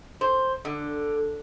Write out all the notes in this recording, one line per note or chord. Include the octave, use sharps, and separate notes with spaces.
C5
D3